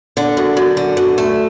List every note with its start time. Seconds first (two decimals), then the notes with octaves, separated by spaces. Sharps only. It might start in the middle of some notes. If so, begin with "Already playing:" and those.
0.17 D3
0.37 F#2
0.57 F#2
0.77 D3
0.97 F#2
1.18 A3